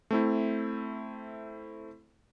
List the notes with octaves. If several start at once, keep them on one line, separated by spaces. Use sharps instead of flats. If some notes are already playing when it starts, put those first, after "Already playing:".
A3 C4 E4